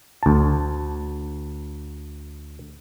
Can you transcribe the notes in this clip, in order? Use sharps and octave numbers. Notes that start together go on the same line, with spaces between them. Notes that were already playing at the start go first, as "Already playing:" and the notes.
D2 A5